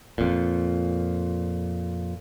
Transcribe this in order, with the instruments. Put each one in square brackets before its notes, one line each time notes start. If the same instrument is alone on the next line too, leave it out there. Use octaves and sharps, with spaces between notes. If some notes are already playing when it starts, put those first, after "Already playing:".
[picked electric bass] F2 A#2